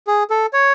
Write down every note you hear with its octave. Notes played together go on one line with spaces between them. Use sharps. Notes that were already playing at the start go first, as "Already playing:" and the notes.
G#4
A4
C#5